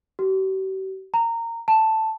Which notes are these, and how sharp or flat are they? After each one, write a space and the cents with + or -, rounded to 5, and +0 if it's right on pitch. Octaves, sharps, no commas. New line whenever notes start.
G4 -45
A#5 -20
A5 +5